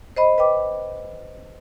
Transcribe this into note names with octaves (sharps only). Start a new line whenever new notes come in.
C5 D#5 B5
B4 D#5 G5 D6